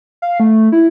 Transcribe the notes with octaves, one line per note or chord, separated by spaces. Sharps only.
F5
A3
E4